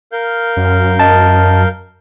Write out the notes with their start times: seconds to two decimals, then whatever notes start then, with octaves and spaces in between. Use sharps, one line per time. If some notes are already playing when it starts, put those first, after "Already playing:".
0.12 A#4 F5 G6
0.57 F#2
0.99 D#5 A5